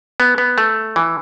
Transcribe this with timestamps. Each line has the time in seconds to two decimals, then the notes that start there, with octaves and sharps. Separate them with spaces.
0.20 B3
0.38 B3
0.58 A3
0.96 E3